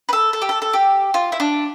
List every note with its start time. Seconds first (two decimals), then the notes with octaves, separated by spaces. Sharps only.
0.09 B4
0.13 A4
0.33 A4
0.42 G4
0.49 A4
0.62 A4
0.73 G4
1.14 F4
1.32 E4
1.40 D4